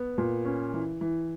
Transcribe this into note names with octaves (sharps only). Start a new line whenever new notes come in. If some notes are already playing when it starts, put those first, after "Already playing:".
Already playing: B3
A#2
C#4
E3
E3